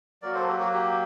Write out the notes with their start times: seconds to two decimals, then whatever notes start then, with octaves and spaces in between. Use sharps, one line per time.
0.22 F#3 A#3 F#4 A#4 D5
0.35 A4 C5
0.48 G4
0.60 F#4
0.74 G4